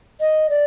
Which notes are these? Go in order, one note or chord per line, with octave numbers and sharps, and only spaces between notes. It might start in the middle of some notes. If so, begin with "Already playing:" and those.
D#5
D5